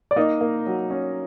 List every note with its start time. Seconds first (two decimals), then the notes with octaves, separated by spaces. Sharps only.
0.11 D5
0.16 A#3 D#4 D#5
0.41 A#3
0.66 F#3
0.90 C#4